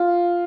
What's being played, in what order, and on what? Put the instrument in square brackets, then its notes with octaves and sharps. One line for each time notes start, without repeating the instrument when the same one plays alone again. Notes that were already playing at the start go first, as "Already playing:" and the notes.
Already playing: [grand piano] F4